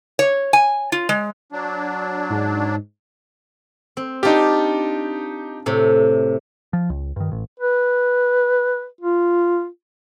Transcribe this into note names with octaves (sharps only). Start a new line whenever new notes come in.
C#5
G#5
F4
G#3
F#3 D4
G#2
C4
D4 D#4 F4 G4
A2 C3
F3
C#2
G2 D#3
A1
B4
F4